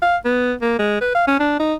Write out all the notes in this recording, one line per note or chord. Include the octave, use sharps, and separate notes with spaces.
F5
B3
A#3
G#3
B4
F5
C#4
D4
D#4